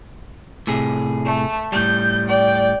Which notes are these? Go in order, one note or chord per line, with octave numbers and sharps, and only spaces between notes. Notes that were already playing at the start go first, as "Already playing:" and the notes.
A2 C3 G#4
A3
A2 G3 G6
D5 G5